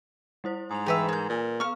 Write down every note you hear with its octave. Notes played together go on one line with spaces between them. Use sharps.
G3 E4 C5
G#2 D#6 F7
E3 G4 G#4 B4 E5
G#4 A#4 B4 G6
A#2
B3 F5 C#6 F6